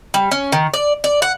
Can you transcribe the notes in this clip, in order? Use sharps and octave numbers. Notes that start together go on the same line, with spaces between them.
G3
C#4
D#3
D5
D5
F#5